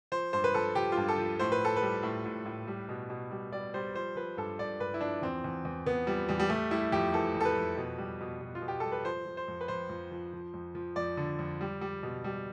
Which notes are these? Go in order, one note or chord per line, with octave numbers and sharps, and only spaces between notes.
F3 C5
G2 C5
B4
F3 A4
F3 G4
F4
G2
A4
F3
A2 C5
B4
A2 A4
B4
G3
A2
A2
A2
G3
B2
B2
G3
G3 D5
G3 C5
F3 C5
F3 B4
G2 A4
G2 D5
G2 B4
E4
F3 D4
E2 C4
E2
E2
E2 B3
F3 G3
E2 G3
G3
G3 A3
G3 E4
F2 G4
E3 A4
F2
A4
B4
F2
B2
G3
B2
B2
F4
B2
G4
G3 A4
B4
F3 C5
F3
C5
F2
B4
F2 C5
F2
F3
F3
F2
F3
F2 D5
D3
F2
G3
G3
B2
G3